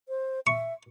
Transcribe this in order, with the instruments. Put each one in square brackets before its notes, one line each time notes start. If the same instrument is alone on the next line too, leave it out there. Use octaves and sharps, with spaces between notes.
[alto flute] C5
[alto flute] E5 [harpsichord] C#6